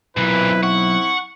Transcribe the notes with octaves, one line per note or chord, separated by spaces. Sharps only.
B1 A#2 E3 C4 E4 B4
F#5 C#6